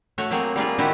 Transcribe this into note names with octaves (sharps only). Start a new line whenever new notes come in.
A3 F#4 C#5
F#3 A#3 C4 G#4 C#5
G3 A#3 F4 G#4
D#3 E4 F#4 G4 C5